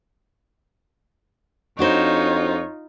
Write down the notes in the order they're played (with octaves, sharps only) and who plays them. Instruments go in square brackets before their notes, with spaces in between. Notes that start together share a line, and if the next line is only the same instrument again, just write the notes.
[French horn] F2 [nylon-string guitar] D4 F#4 C5 [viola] D#4 F4 [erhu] C#5